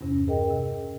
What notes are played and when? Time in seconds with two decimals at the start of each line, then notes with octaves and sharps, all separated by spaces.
0.01 E2 G2 C3 C#4
0.28 G#4 A#4 D#5 G5
0.50 C3